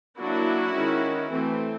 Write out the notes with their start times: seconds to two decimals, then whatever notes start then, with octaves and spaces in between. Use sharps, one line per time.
0.19 F#3 A#3 D4 E4 F#4
0.75 D#3 G#3 C#4
1.31 E3 A3 C4